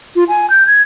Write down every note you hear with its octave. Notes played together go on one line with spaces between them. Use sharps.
F4
G#5
G6
G#6